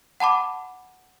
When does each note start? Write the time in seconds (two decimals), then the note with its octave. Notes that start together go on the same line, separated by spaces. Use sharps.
0.20 F#5 A5 B5 D6